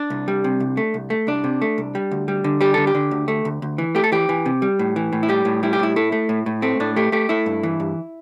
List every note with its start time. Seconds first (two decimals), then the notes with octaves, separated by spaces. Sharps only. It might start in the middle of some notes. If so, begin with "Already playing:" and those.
Already playing: D4
0.10 C2
0.28 G3
0.44 C3
0.60 C2
0.77 A3
0.94 C2
1.10 A3
1.27 C2 D4
1.44 C3
1.62 A3
1.78 C2
1.95 G3
2.11 D2
2.28 G3
2.44 D3
2.61 G3 G4
2.74 D3 A4
2.87 G4
2.95 D3
3.11 D2
3.28 A3
3.45 D2
3.62 D2
3.78 E3
3.95 A3 G4
4.04 A4
4.12 E3 G4
4.29 E3
4.46 C3
4.62 G3
4.79 A2
4.96 E3
5.13 A2
5.23 E4
5.29 G3 G4
5.45 A2
5.63 G3 E4
5.73 G4
5.79 A2 E4
5.96 A3 E4
6.12 A3
6.29 A2
6.46 A2
6.62 A3 C4
6.80 A2 D4
6.96 A3 G4
7.12 A3 G4
7.29 A3 E4
7.46 G2
7.63 E3
7.80 G2